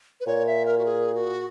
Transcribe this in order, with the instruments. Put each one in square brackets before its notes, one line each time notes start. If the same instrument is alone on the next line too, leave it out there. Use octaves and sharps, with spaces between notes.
[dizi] B4
[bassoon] A#2 [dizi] C#5
[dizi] E5
A#4
F#4
G#4
F#4